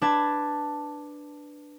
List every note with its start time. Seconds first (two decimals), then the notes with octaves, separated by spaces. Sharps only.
0.02 D4 B4 A5 G#6